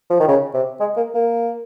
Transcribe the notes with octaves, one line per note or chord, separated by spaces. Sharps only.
F3
D#3
C#3
C3
G#3
A#3
A#3